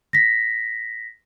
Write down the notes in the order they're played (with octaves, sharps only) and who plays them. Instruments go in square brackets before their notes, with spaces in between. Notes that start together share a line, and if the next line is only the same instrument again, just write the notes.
[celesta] A#6 B6